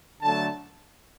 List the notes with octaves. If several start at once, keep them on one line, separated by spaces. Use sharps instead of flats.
D3 F#3 A3 A5